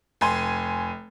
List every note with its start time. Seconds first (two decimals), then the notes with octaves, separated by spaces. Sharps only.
0.21 F1 G#5 C6